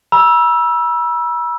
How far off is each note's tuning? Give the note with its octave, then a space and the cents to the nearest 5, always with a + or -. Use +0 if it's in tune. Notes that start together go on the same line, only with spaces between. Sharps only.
B5 -45 E6 +5